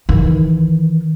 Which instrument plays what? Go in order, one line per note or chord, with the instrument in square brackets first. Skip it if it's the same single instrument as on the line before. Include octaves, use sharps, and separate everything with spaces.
[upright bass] D#3 E3